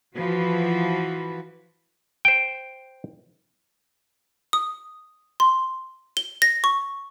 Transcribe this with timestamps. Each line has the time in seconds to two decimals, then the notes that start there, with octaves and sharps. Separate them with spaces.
0.17 E3 F3 F#4 B4
2.25 C5 G5
4.53 D#6
5.40 C6
6.17 G7
6.42 A#6
6.64 C#6